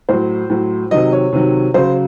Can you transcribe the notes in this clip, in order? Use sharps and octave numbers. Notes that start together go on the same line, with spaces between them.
A2 F#3 C5
A2 F#3
C3 D#3 F#3 D#5
C#5
C3 D#3 F#3
C#3 F#3 C5